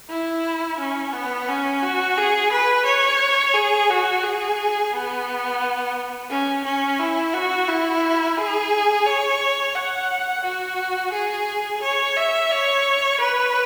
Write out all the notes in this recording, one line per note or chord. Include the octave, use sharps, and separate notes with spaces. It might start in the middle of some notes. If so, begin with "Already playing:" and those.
E4
C#4
B3
C#4
F#4
G#4
B4
C#5
G#4
F#4
G#4
B3
C#4
C#4
E4
F#4
E4
G#4
C#5
F#5
F#4
G#4
C#5
E5
C#5
B4